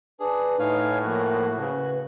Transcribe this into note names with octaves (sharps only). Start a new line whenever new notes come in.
D4 G#4 B4
A2 D#4 C#5 F5 G#5
F3 A#3 F#4 F#6
C#3 B4